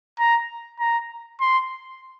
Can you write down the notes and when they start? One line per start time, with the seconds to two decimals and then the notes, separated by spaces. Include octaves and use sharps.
0.19 A#5
0.80 A#5
1.41 C6